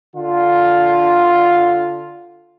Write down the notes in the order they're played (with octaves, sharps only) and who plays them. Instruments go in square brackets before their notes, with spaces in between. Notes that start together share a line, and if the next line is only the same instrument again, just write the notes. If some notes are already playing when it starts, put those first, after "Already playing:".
[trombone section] D3 F4